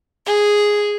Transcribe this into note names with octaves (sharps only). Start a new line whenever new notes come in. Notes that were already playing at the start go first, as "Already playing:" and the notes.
G#4